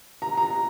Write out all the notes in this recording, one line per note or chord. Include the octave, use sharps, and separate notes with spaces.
A#5
A#5